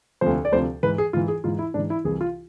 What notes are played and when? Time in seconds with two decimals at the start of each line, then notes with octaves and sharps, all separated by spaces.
0.21 D2 C3 F3 C5
0.45 D5
0.52 D2 C3 F3 C5
0.83 G#2 E3 B4
0.98 G#4
1.13 G#2 E3 F4
1.28 G#4
1.44 G#2 E3 F4
1.59 E4
1.74 G#2 E3 D4
1.90 E4
2.05 C2 C3 E3 G#4
2.21 F4